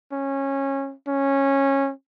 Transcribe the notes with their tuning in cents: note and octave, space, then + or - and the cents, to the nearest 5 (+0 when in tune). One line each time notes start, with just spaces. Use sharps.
C#4 -20
C#4 -15